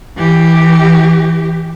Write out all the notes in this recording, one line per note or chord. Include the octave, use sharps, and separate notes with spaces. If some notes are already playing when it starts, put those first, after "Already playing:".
E3 G4